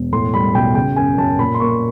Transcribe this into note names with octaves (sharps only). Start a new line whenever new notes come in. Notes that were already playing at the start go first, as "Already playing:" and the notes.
Already playing: E1
A2 C6
G3 B5
B1 G5
C#3 G5
F#2 G#5
F#2 A5
A#2 B5
C6
A#3 C#6